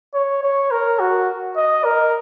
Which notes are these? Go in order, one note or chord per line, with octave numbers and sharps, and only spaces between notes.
C#5
C#5
A#4
F#4
D#5
A#4